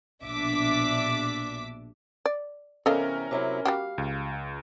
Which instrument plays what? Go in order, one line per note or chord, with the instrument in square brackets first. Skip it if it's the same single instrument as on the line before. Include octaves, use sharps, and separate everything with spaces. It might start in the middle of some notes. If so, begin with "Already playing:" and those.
[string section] A#1 B2 D4 E5 D6 B6
[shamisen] D5
[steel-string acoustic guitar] E2 C3 [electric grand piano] C#4 A#4 [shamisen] A4 D#5 F5
[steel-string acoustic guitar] C3 F#3 E4
[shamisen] G3 F#4 G4 [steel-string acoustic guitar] F5
[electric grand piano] C#2